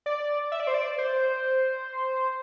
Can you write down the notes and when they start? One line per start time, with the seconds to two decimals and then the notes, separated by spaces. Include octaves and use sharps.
0.06 D5
0.52 E5
0.60 D5
0.67 C5
0.74 D5
0.98 C5